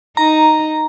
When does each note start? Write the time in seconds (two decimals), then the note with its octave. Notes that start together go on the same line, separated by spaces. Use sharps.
0.17 D#4 A#5